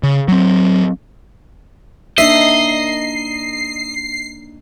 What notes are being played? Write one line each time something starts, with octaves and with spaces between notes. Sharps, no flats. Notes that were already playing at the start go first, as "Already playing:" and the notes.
C#3
F#3 C4
A#3 D4 D#4 D#5 E5 C7